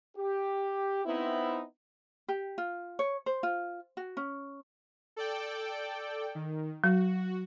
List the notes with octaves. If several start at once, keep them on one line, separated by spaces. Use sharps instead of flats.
G4
B3 C4 D#4 E4
G4
F4
C#5
C5
F4
F#4
C#4
A4 D5 G5
D#3
F#3 F#4